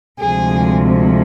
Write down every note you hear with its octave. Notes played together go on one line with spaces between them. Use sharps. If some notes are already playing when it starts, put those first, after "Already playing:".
D2 C3 F3 G#3 G#4